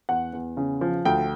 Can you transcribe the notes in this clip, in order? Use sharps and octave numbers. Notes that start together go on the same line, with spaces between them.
E2 F#5
E2
C#3
F3
D2 G5